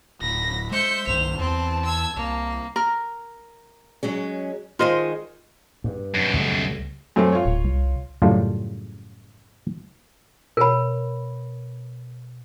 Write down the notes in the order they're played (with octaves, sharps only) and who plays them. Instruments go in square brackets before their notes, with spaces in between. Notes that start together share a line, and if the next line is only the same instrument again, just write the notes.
[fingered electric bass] D1 [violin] B5 [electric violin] A#6
[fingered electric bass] G#3 [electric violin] C5 C#7 [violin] E5 G6
[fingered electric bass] C2 G2 D#3 [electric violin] C5 [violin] F7
[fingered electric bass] E2 [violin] C4 [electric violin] A5
[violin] E6 G#6
[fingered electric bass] C2 [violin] A#3
[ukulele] A#4
[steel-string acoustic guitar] F#3 G#3 C#4
[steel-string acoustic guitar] D#3 G#3 [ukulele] F4 C5 D#5
[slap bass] G2
[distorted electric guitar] F#2 B2
[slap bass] C#2 G3 A3
[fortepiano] F#2 A3 C4
F4 C#5
[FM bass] D1
C2
[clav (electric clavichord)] F#2 A2 C#3 G3 F4 A5
[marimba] B2 C#5 [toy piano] A#4 B5